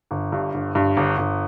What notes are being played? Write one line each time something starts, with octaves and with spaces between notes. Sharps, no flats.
G1
G2
G1
G2
G1
G1